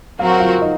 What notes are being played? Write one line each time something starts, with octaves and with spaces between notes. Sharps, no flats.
F#3 C4 F#4 A#4 F5
F#5
F4 F5
D#4 D#5